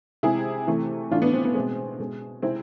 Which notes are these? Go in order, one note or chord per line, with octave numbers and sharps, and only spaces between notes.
C3 G#3 E4 G#4
C3 E3 A3
A2 E3 A3 D4 F4
B3 D4
C4
B3
B2 G#3 C4
B2 G#3
C3 G#3 C4 E4